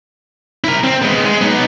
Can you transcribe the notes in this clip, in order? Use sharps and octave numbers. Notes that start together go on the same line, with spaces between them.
E4 A#4
C4
G#3 B3
G#3
B3 D#4